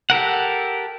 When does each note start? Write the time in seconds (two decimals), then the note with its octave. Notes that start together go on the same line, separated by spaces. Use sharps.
0.10 G4 A4 A#4 F#5